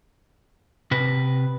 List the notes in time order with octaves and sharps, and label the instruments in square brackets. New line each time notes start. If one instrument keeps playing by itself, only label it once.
[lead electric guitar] C3 B4